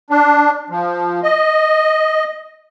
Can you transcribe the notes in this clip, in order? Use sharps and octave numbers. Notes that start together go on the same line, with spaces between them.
D4
F3
D#5